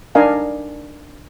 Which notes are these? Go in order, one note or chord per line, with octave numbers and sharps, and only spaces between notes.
D4 D#4 A#4 D#5 F5 G#5